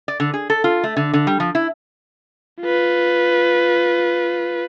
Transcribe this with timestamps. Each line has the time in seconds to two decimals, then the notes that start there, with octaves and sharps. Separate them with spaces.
0.08 D5
0.20 D3
0.34 G#4
0.50 A4
0.64 F4
0.84 A3
0.97 D3
1.13 D3
1.27 G3
1.40 F3
1.55 E4
2.61 F4 B4